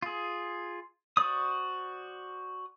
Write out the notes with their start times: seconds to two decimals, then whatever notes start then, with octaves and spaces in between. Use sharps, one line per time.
0.02 F4 G#4
1.17 F#4 C5 D5 D#6